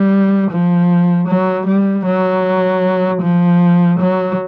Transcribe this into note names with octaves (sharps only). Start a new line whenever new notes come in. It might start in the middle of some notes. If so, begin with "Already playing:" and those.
Already playing: G3
F3
F#3
G3
F#3
F3
F#3